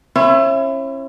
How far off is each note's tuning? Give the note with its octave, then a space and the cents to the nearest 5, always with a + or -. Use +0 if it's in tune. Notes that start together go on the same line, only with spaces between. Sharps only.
C#4 -40 E4 +25